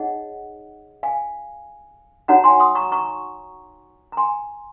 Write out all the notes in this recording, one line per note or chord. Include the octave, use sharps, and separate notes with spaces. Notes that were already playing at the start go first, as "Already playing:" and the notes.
Already playing: D#4 G#4 C#5 D#5 F#5
F5 G#5
D#4 F#4 C#5 F#5 A#5
G#5 C6
C6 D#6
A#5 C#6
A#5 C#6
A#5
G#5 C6